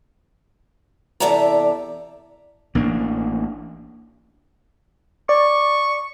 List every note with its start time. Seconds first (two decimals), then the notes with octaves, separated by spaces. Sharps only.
1.20 E2 C3 A4 D5 E5 A#5
2.75 A1 A#3 D4
5.29 D5 C#6